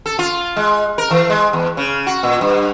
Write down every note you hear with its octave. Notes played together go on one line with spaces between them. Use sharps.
A4
F4
G#3
A#4
E3
G#3
E2
C#3
F#4
A#2
G2